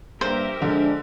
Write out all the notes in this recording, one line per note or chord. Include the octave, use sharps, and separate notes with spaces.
G2 A#3 G4 A#4 C5 E5
D3 F3 G#3 D4